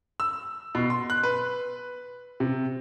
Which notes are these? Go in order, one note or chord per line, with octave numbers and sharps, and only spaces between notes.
E6
B2
C6
F#6
B4
C3